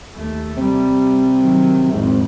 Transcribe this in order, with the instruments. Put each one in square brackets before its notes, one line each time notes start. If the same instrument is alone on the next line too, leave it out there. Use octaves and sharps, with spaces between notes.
[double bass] D#2 A3
[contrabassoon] C3 [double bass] G3
[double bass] D#3 F#3
[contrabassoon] G#1 [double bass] F2 A2